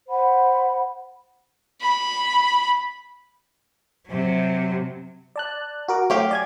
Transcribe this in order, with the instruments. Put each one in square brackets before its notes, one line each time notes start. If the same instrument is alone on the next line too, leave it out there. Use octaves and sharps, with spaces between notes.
[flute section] C5 F#5 B5
[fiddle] B5
[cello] C3 F#3
[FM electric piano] D5 A5 F#6
F#4 A#4 D6
[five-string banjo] F#3 G4 F5 [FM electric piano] A3
[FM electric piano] D5 G#5 G#6